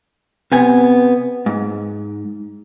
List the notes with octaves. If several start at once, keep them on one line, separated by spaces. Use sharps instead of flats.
C3 B3 G#5
G#2